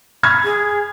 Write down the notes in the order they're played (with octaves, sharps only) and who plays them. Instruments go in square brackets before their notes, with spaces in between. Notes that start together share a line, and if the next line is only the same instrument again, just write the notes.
[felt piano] B5 F6 G#6
[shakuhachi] G#4